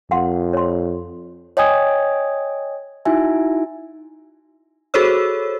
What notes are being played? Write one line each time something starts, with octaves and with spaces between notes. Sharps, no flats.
F2 F5 F#5 C6
C#5 C6
C#5 D#5 G5 G#5 D#6 G#6
D#4 E4 F#4 E5 G#5
F#4 G#4 A4 C5 C#5 E6